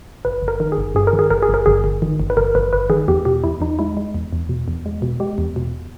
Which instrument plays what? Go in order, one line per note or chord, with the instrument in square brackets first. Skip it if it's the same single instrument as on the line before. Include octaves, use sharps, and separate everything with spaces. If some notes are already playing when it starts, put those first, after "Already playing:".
[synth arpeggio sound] G1 B4
G1
A#4
D#3
G#4
G1
G2 G#4
A#4
D#3
G#4
G1 A#4
G#4
G1 A#4
G1 G#4
G1
D#3
G1
B4
G1 A#4
G1 B4
G1 B4
D#3 G#4
E2 G4
B2 G4
E2 E4
E2 D#4
G#3 E4
G#3
E2
E2
B2
E2
G#3
B2
G#3 G4
E2
B2